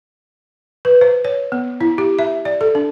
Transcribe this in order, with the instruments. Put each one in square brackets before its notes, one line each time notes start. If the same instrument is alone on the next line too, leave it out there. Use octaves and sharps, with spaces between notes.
[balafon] B4
C5
C#5
B3
E4
G4
E5
D5
A4
D4